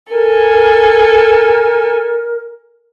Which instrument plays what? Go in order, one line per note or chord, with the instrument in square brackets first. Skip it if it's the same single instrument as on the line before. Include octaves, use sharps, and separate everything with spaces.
[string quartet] A4 G#5 [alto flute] A#4